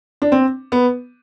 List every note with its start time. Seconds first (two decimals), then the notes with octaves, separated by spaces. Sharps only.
0.22 D4
0.32 C4
0.72 B3